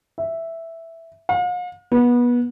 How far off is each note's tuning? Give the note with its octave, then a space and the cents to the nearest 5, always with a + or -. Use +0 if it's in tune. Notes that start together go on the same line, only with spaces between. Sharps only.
E5 +0
F5 +45
B3 -25